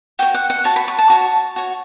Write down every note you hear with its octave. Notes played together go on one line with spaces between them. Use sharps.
F#4 C#5 G5
F#5
F#5
F#4 C#5 A5
B5
C#6
A5
F#4 C#5
F#4 C#5